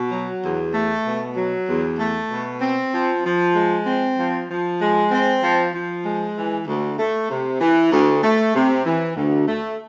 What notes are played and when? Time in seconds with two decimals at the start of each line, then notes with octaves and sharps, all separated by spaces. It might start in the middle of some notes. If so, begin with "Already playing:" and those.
Already playing: B2
0.11 F#3
0.43 E2
0.74 A3
1.06 B2
1.36 F#3
1.68 E2
1.99 A3
2.31 B2
2.61 C4
2.93 F3
3.24 F3
3.55 G#3
3.86 C4
4.17 F3
4.49 F3
4.81 G#3
5.11 C4
5.43 F3
5.73 F3
6.05 G#3
6.35 E3
6.67 D2
6.99 A3
7.30 C3
7.61 E3
7.92 D2
8.23 A3
8.55 C3
8.85 E3
9.16 D2
9.48 A3